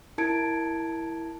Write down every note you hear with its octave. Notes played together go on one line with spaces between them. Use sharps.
E4 A#4 A5 G#6 C#7 D7